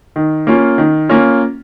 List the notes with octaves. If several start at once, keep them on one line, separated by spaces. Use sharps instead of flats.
D#3
A#3 C#4 F4
D#3
A#3 C#4 F4